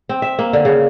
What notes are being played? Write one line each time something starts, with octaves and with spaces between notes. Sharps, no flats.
C4
E5
A#3
D3
C#3